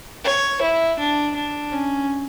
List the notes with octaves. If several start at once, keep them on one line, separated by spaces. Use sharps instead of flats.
C#5
E4
D4
D4
C#4